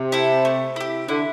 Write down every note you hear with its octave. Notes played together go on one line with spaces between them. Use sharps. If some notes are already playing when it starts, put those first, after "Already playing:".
Already playing: C3
E4 A4
A3
E4 G4
D3 E4